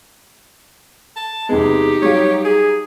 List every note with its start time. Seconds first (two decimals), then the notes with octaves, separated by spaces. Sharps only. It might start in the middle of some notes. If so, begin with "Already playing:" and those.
1.16 A5
1.49 E2 C3 G#3 B3 D#4 G4
2.02 F#3 G3 C#5 F5
2.45 G#4